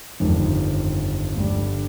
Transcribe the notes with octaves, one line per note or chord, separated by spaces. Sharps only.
G1 F2 D#3 G3
G1 G2 D3 G3